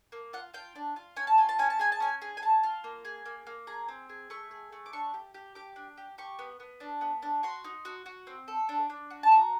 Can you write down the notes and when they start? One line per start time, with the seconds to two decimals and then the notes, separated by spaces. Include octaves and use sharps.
0.12 A#3
0.33 F4 F#5
0.54 F4 G5
0.75 D4
0.96 F4
1.16 C#4 G#5
1.27 A5
1.38 F4 G#5
1.49 A5
1.59 C#4 G#5
1.70 A5
1.79 G#4 G#5
1.92 A5
2.00 C#4 G#5
2.22 G#4
2.37 G#5
2.42 G#4 A5
2.63 F4
2.84 A#3
3.05 G#4
3.26 A#3
3.47 A#3
3.67 G#4 A#5
3.88 C4
4.09 G#4
4.30 A3 C#6
4.51 G#4
4.72 A3
4.86 D6
4.93 D4 C#6
5.14 G4
5.34 G4
5.55 G4 D6
5.76 D4
5.97 G4
6.18 G4 C#6
6.39 B3
6.60 B3
6.80 D4
7.01 B3
7.22 D4
7.43 F#4 C6
7.64 D#4
7.85 F#4
8.06 F#4
8.27 C4
8.48 A4
8.69 D4
8.90 D4
9.10 F#4
9.23 A5
9.31 F#4 A#5